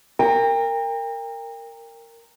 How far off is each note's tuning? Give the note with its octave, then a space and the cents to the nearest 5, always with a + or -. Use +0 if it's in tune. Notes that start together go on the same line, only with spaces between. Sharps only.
A#4 -15 G5 +35